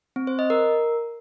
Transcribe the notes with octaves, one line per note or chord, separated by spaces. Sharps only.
C4
C5
D#5
A#4